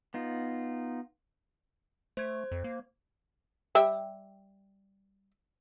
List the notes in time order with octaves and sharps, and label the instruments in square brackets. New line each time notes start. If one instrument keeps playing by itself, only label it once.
[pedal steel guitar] B3 D#4 F4
[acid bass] A3 [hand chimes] C5 G#6
[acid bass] F2
A#3
[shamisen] G3 E5 G5